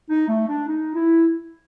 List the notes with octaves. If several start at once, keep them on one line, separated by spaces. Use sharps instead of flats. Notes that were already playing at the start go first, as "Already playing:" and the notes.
D#4
A3
D4
D#4
E4